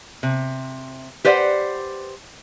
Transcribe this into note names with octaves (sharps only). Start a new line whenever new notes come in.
C3
G4 B4 C5 D5 E5 F#5